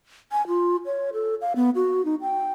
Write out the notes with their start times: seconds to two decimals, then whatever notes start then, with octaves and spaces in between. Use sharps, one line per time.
0.32 G#5
0.48 F4
0.86 C#5
1.13 A4
1.41 F5
1.56 B3
1.75 F#4
2.05 D#4
2.22 G5